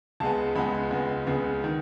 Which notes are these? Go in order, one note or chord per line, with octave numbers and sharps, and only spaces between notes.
C#2 C#3 G#3 B3 A5
C#2 C#3 G#3 B3 B5
C#2 C#3 G#3 B3
C#2 C#3 G#3 B3
D#3